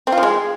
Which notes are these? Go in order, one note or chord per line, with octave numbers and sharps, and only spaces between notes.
C4
F4
F3
G#3